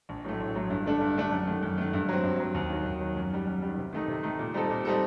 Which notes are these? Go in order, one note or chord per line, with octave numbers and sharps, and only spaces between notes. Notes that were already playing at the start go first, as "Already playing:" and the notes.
A#1
A2 F#3 A3
A#1
A2 F#3 A3
G2
D3 A3 D4 A4
G2
D3 A3 D4 A4
F#2
D#3 A3
F#2
D#3 A3
G2
F#3 C4
G2
F#3 C4
D#2
D#3 F#3
D#2
D#3 F#3
F#2
D#3 G3
F#2
D#3 G3
C3
D#3 A3 D#4
C3
D#3 A3 D#4
A#2
G3 C4 D#4 A4
A#2
G3 C4 D#4 A4